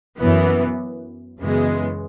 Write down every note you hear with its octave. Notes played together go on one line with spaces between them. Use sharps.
F#2 E3 B3
F#2 C#3 E3 G#3 B3